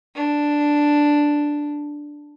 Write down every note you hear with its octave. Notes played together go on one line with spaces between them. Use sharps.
D4